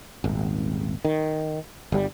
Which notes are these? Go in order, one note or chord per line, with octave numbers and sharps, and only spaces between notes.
D#1 G#1
D#3
G1 G3